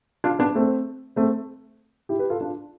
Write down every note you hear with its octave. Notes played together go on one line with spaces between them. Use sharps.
D4 F4
B3 D4
A3 C4
A3 C4
E4 G4
G4 B4
F4 A4
D4 F4